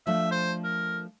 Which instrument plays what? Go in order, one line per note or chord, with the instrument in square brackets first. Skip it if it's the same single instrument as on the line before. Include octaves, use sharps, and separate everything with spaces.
[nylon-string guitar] F3 A3 D4 [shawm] E5
[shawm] C5
A#4